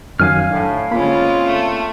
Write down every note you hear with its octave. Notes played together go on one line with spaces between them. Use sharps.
F#2 D#3 F#3 F5 G#5 F6
A2 D4
D3 G#3 A#3 C4 C#4 F4 B5
A3